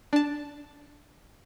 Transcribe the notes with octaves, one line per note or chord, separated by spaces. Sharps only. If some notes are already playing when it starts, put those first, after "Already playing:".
D4 A5